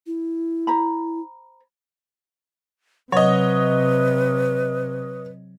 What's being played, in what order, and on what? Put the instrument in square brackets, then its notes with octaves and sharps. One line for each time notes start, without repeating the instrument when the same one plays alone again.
[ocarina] E4
[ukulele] C5 A#5 B5
[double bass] C3 [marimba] F#3 [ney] B4 [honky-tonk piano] C#5 D#5